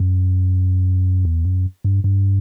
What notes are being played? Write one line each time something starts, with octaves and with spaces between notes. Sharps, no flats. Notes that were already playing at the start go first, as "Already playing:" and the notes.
Already playing: F#2
E2
F#2
G2
G2